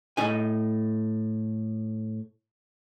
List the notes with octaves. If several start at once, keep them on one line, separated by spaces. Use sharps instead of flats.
A2 D#4 G#5